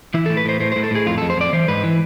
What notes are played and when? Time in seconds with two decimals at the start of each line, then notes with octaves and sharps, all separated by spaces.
0.14 E3 E4
0.26 A2 A4
0.37 B4
0.45 A2 C5
0.60 A2 C5
0.72 A2 C5
0.83 A4
0.91 A2 G#4
1.06 F2 F4
1.18 F2 A4
1.30 C5
1.37 F2 D5
1.53 E3 C5
1.68 G#2 B4
1.84 E3